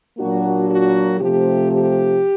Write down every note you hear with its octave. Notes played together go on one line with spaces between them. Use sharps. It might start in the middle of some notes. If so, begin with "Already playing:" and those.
A#2 F#3 A#3 D4 F#4
F#4
C3 F3 A3 G4
G4